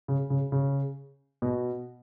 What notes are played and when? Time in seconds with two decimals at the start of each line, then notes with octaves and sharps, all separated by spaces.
0.08 C#3
0.30 C#3
0.52 C#3
1.42 B2